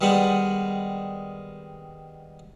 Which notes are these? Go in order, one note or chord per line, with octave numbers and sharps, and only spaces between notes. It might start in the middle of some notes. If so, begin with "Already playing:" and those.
D#3 G3 G#3 B3